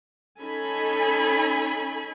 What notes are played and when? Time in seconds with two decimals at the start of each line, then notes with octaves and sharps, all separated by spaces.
0.40 C#4 D#4 A4 G#5 B5